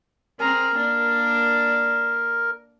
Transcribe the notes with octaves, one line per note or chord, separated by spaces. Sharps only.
C4 G#4 A#4 A#5
A#3 D4 D5